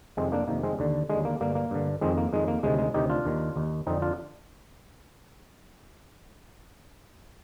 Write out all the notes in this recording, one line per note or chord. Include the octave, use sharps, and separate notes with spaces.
F2 C3 D#3 G#3 C4
A#3 D4
F2 C3 D#3 A#3
G#3 C4
D#2 D3
D#2 D3 G#3
A#3
G2 D3 A#3
A#3
G2 D3
F2 D#3 G#3 C4
A#3
F2 D#3 G#3
A#3
D2 C3 D#3 G#3
G#3
D2 C3 D#3 D#4 G4
D4 F4
D#2 D#3
D#2 D#3
F2 D3 C4 D#4
D4 F4